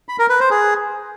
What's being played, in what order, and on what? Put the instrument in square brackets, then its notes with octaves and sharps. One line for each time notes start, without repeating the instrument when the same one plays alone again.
[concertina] B5
A#4
B4
C5
G#4